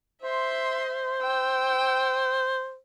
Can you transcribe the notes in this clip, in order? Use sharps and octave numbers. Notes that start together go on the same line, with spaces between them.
C5 E5 C6
G5 E6